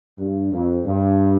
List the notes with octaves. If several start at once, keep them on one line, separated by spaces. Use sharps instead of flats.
G2
F2
G2